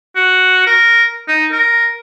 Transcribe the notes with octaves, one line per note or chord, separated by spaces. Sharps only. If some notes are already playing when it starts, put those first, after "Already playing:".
F#4
A#4
D#4
A#4